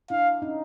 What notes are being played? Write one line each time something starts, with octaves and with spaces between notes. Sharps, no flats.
D4 E4 F5
C#4 D#4